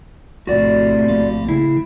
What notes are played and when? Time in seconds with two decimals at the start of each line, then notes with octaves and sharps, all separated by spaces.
0.47 A#1 A2 C3 F#4 D5
1.08 A#1 A#3
1.49 C#3 E4